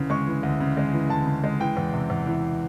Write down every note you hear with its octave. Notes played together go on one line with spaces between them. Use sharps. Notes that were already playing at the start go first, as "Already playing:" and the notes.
Already playing: D2 C#3 E3
G#3 C#6
E3
D2
C#3
G#3
E3
D2 A5
C#3
G#3
E3 G5
E2
C3
E2
E3